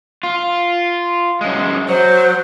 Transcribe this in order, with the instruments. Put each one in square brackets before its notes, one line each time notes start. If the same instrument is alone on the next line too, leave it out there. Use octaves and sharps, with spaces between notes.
[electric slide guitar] F4
F#2 G#3
[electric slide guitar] F#3 [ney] C5